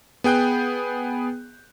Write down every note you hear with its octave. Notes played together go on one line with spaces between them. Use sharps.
B3 G#4 G5 F#6 G6